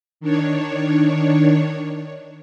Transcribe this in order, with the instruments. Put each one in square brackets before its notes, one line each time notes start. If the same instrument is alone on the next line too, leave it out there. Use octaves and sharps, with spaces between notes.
[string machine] D#3 D4 C#5